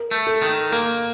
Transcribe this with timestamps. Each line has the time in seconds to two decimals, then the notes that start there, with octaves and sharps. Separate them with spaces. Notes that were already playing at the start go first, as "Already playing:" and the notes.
Already playing: A#4
0.11 A3
0.27 A4
0.42 D#3
0.72 A#3 A#4